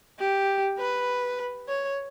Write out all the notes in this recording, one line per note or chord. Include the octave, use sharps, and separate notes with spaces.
G4
B4
C#5